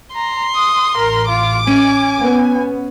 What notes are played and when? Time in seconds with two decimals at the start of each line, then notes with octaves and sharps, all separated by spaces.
0.16 A#5 C6
0.56 D#6
0.97 A1 A#4
1.29 F4 D6
1.67 C#4 G#5
2.20 B3